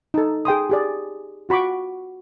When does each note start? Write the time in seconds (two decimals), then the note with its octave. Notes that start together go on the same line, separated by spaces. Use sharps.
0.14 D#4 A4
0.45 G#4 G5 C6 D#6
0.70 G4 G#4 D5
1.49 F4 F#4 B5 C#6 D6